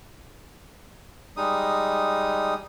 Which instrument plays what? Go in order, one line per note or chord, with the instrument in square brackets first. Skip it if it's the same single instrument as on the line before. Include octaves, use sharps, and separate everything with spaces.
[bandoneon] G3 G#3 D#4 D#6